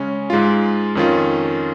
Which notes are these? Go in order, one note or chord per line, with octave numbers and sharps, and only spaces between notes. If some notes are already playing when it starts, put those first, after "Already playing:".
Already playing: C#3 G#3 C#4
G#2 G#3 F4
F2 D#3 C#4 F4